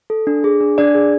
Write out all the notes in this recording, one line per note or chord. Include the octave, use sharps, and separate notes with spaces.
A4
D4
G#4
D4
D4 D5
G#4